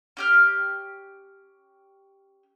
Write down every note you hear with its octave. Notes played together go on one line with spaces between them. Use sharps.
C#4 G4 F6